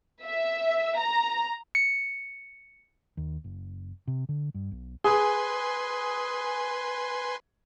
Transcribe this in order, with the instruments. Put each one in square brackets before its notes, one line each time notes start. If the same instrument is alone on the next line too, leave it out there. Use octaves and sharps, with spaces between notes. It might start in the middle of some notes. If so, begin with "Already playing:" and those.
[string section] E5
A#5
[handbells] C#7
[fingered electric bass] D#2
F#1
C3
D3
G2
B1
[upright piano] G#4 [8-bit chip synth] B4 G#5 C6